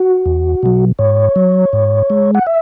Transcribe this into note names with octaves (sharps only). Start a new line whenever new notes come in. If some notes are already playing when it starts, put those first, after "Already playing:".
Already playing: F#4
E2
B2 F#3
G#2 C#5
F#3
G#2
G#3
F#5
E5